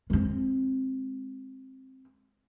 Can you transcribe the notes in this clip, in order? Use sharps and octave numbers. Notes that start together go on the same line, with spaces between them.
G#3 C4